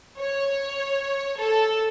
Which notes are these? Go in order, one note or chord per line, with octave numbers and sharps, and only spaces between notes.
C#5
A4